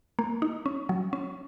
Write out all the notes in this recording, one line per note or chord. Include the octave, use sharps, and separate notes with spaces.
A#3
D#4
C#4
F#3
C#4